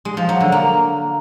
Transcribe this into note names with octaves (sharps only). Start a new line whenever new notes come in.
G#3
F3
F#3
D3
A#3